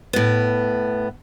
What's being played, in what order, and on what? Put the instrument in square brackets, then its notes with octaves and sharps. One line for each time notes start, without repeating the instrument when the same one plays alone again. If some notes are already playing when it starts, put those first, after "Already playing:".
[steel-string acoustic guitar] A2 B3